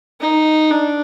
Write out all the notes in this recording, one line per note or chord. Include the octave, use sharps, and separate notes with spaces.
D#4
D4